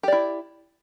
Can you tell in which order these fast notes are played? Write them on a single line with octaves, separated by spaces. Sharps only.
G4 D5 E4